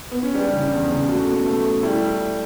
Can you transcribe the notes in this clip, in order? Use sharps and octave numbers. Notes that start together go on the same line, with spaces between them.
B3
C#4
G3 D4
C#3
E2
C#3
A3 F#4
B2
A3
A3
G3 E4